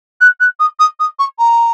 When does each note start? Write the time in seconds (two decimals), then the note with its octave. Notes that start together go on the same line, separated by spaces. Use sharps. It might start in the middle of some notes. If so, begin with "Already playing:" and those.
0.21 F#6
0.40 F#6
0.59 D#6
0.79 D#6
1.00 D#6
1.19 C#6
1.39 A#5